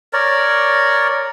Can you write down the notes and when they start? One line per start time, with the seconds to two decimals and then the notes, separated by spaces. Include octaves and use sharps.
0.13 A#4 C#5 D5